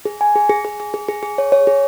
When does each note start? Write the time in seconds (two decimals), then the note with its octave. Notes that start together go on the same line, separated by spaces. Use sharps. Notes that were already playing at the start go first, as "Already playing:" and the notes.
0.05 G#4
0.21 G#5
0.36 G#4
0.49 G#4
0.65 G#4
0.80 G#4
0.94 G#4
1.08 G#4
1.23 G#4
1.38 C#5
1.52 C#5
1.67 G#4